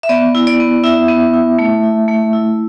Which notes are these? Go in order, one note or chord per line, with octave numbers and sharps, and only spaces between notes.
E5
B3 D5
E4
D5
B3
E4 E5
B3
E4
A3
E4
A3
E4